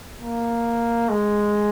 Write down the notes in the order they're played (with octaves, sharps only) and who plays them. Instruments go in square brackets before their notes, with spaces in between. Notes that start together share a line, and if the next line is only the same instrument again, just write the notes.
[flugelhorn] A#3
G#3